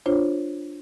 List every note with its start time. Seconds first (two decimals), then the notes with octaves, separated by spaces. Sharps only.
0.06 D4 F4 C5 C#5